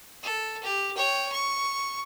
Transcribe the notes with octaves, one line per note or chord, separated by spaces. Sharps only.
A4
G4
C#5 G5
C#6